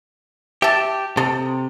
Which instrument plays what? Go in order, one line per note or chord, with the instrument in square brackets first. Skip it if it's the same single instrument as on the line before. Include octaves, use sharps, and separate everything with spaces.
[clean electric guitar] G4 [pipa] E5 A5
[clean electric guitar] C3 [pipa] A4 D#5